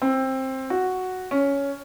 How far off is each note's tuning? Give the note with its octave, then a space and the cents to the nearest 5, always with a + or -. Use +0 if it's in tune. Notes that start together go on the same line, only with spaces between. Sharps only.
C4 +15
F#4 +0
C#4 +10